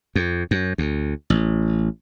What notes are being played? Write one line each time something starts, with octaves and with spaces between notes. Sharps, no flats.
F2
F#2
D2
A1